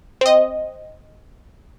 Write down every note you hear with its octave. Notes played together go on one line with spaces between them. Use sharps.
C4 D#5